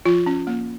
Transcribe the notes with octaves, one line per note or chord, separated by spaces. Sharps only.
F3 F4
C#4
A#3